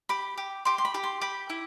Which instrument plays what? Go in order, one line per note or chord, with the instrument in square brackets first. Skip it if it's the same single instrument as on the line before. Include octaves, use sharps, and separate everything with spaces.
[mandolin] G4 [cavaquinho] B5
[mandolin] G4
[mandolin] G4 [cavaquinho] C6
[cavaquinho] C6
B5
[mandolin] G4
[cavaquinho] C6
[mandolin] G4 [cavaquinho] B5
[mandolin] E4